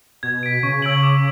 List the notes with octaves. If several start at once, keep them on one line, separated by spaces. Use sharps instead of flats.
B2 G#6
B6 D7
C#3 C#6
E6 G#6 D7 F#7
D6